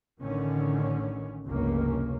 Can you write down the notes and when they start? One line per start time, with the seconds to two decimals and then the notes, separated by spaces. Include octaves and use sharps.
0.18 A1 A2 D3 D#3 C#4
1.46 F1 C#2 G2 A#3 C#4